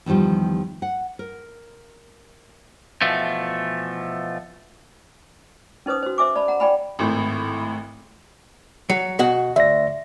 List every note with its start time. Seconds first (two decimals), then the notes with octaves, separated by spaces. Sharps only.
0.06 E2 D#3 F3 G3 G4
0.82 F#5
1.19 A#4
3.01 B2 E3 F3 A3
5.86 C#4 D#4 B4 C5 D#6
6.03 F#4 C5
6.18 C5 E5 G#5 D6
6.35 D5 A5 B5
6.48 F#5 A#5
6.60 D5 G5 G#5 B5
6.99 G#1 A2
8.90 F#3 C#7
9.19 B2 F#4 F#5
9.56 D2 E5 A#6